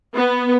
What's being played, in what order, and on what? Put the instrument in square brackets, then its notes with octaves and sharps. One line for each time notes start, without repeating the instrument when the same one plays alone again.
[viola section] B3